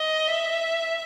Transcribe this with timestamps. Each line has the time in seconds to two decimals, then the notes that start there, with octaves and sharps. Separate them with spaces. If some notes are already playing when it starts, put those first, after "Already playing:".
Already playing: D#5
0.29 E5